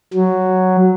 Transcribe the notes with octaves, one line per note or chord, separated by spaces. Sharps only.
F#3